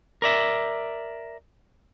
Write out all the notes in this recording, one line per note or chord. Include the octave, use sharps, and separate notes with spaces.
A#4 D5 E5